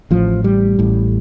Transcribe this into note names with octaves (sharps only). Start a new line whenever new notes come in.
A1 A2 F3
G3
A1 A2